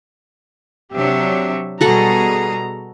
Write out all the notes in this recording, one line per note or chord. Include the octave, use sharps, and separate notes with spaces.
C3 F#3 D4 G4 E5
B2 G3 F#4 G#4 A4 F#5 A#5